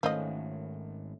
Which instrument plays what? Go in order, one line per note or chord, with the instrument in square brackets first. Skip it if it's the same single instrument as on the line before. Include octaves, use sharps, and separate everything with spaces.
[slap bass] G#1 D#3 [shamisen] F3 D#5 [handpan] A3 C#4